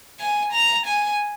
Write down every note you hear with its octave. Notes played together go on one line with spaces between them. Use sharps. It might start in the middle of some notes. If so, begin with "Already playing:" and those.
G#5
A#5
G#5